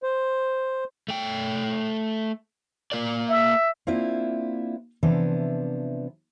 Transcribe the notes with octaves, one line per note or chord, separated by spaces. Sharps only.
C5
A3 G5
A#3 A#4 D5
E5
A#3 C4 D4 E4 F4 E5
C3 E3 F3 B3 D4